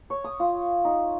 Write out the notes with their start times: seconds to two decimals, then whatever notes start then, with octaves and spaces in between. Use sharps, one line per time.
0.10 C#5
0.24 D#6
0.40 F4
0.85 D#4